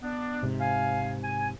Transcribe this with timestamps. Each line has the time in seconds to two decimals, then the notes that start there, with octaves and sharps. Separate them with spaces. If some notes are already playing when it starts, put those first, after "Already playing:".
0.02 B3 D4
0.43 G#2 C3
0.61 F5 G#5
1.24 G#5